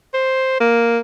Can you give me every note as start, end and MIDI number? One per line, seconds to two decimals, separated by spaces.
0.14 0.56 72
0.60 0.98 58